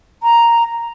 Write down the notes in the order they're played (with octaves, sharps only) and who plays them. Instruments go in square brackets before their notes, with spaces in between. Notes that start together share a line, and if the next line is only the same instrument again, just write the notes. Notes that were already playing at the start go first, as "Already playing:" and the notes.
[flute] A#5